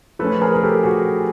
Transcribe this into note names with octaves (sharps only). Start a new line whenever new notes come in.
F3 A3 C#4 A4 B4
G#4 A#4
A#4
G4 A4
F#4 G#4